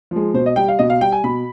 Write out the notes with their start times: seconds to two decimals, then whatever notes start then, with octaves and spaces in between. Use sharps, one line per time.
0.11 F3 G#3
0.34 B2 C5
0.46 D#5
0.56 G3 G5
0.68 F5
0.79 B2 D#5
0.90 F5
1.01 G3 G5
1.12 G#5
1.24 B2 B5